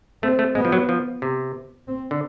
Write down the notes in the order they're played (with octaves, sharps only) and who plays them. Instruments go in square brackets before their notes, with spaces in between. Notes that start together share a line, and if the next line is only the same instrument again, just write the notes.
[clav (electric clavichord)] A3 [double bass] C4
[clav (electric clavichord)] A3
[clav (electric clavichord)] G#3 [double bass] B3
[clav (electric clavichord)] F3
F#3
F3
C3
[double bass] C4
[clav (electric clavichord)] D3